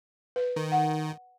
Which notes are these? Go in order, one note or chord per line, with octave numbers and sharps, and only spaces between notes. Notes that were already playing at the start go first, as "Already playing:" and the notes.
B4
D#3
F#5